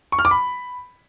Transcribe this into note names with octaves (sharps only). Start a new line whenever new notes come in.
C#6
F6
D6
B5